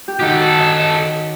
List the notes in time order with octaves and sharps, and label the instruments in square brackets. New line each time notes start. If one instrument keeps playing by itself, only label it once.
[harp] G4
[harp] D#3 D#4 F#4 [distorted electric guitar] G4 A4
[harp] C#5
D#5